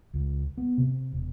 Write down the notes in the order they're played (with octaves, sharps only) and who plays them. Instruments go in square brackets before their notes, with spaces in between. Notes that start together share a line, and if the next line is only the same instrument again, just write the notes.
[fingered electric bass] C#2
B3
C3
E1